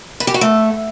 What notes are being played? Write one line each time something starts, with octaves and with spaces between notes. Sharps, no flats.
B4
G4
F#4
A3